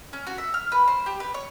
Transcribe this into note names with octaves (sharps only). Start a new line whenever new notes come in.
C#4
F#4
E5
F6
B4
C5
G4
B4
C#5